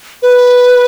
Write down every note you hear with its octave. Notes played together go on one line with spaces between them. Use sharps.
B4